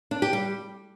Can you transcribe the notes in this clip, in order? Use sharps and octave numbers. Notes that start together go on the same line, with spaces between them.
D4
G4
G3